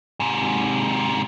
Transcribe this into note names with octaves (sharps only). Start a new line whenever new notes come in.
G#2 C3